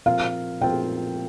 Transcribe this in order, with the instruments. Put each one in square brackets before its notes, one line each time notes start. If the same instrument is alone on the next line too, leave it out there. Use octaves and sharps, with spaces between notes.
[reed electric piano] A#2 F3 C4 F4 A#4 [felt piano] F5
[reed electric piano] A#2 F3 C4 F4 A#4 [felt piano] G5